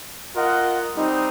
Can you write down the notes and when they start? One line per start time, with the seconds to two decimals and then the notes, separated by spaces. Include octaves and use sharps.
0.36 F4 A#4 D#5 F#5
0.95 G3 C4 D#4